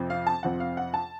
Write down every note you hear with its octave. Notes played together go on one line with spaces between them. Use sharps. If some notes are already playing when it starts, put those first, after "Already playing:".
Already playing: F2 C3 F3 C4
F5
A5
F2 C3 F3 C4 F#5
F5
F#5
A5